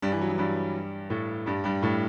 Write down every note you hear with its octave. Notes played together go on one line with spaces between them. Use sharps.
G2 G3
E3
F#3
E3
G2 G3
A2 A3
G2 G3
G2 G3
A2 A3